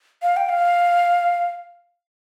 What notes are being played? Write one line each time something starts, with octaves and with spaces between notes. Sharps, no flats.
F5
G5
F5